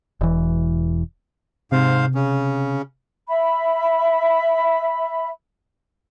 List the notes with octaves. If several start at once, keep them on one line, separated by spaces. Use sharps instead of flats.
E1 E3
G#2 C3 C5 F5
C#3 C#4
E5 B5